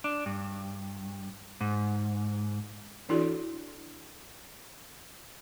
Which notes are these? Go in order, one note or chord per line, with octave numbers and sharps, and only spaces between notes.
D4
G2
G#2
E3 D4 E4 F#4 A4 D5